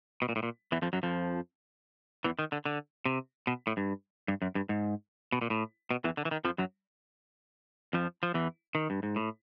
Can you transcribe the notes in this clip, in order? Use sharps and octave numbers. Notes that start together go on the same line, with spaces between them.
B2
A#2
A2
A#2
E2 E3
F2 F3
F#2 F#3
F2 F3
E2 E3
D#3
D3
D3
C3
B2
A2
G2
G2
F#2
G2
G#2
B2
A#2
A2
B2
E2 E3
D3
E3
D#3
F2 F3
F#2 F#3
F2 F3
F3
E2 E3
D#3
G2
G#2
A2